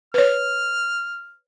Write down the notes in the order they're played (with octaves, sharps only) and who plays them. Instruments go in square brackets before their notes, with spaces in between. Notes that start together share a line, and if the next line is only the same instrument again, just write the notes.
[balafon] B4 C#5 [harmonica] F6